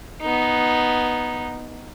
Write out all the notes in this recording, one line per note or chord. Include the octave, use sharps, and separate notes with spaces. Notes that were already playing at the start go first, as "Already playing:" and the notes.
B3 D#4